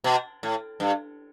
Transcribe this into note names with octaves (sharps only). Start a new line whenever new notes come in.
B2
A2
G2